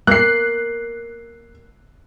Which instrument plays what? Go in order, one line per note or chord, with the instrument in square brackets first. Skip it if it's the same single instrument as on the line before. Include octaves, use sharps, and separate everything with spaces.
[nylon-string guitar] A#3 [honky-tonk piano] F#6 C7